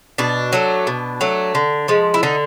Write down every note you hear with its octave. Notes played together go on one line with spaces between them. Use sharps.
B2 D4
F#3 A3
B2
F#3 A3
D3
F3 G#3
E4
D3 D#4